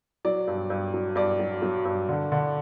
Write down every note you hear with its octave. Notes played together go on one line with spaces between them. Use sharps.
F#3 D5
G2
G2
F#3
G2 D5
F#3
F#3
G2
D3
D3